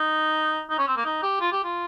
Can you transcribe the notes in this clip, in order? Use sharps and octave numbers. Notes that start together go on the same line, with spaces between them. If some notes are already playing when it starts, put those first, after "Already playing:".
Already playing: D#4
D#4
C#4
C4
A#3
D#4
G4
F4
G4
F4